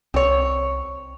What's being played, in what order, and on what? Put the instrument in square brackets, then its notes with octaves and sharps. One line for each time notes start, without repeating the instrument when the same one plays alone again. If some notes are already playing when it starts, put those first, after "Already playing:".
[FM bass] C2 [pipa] C4 C#5